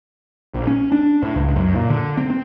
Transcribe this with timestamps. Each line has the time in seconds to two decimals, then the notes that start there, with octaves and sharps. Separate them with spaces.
0.54 A#1
0.67 C#4
0.92 D4
1.23 A2
1.35 C#2
1.56 F#2
1.75 A#2
1.89 D3
2.17 C4
2.30 C4